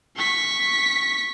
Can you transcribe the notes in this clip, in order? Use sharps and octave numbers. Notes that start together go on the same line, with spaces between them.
C#6 B6